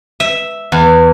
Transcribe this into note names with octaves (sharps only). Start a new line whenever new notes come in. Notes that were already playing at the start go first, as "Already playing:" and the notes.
E5
E2